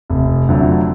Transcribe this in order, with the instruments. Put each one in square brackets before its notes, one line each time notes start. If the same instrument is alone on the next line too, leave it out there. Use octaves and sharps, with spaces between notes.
[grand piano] F1
F2 D3 F#3 A3